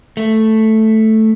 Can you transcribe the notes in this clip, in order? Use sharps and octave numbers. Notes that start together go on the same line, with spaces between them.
A3